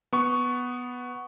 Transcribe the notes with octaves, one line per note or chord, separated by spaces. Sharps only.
B3 C#6